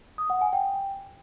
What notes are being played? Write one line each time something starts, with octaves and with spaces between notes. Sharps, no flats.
D#6
F#5
G#5
G5